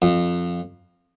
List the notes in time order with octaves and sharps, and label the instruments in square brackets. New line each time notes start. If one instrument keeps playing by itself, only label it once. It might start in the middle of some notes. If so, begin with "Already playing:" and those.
[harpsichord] F2